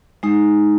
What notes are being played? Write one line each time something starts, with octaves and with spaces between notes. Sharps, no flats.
G#3 D#4